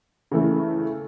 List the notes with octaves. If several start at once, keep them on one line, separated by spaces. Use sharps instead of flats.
C#3 E3 A3